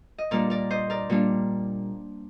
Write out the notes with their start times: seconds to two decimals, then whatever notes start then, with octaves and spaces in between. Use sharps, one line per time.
0.18 D#5
0.31 A#2 G3 A#3 D4 A#4 D5
0.50 A#4 D5
0.70 C5 D#5
0.90 A#4 D5
1.10 A#2 G3 A#3 D4